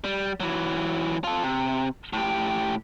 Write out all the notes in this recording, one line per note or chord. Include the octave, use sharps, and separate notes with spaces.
G3
E3 F#3
F4 A4
C3
A2 G4